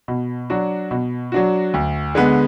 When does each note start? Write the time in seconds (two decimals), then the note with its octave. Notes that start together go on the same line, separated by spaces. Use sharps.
0.08 B2
0.50 F#3 D4 F#4
0.91 B2
1.32 F#3 D4 F#4
1.74 D2
2.15 D3 G#3 B3